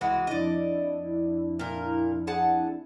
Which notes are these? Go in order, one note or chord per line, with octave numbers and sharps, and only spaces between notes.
C2 E3 G#3 F#4
F2 D4 E4 D5 D#5
A#2 A#4
G#4 F#5 A5